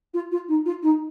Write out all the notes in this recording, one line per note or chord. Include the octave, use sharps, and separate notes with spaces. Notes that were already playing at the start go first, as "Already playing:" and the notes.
F4
F4
D#4
F4
D#4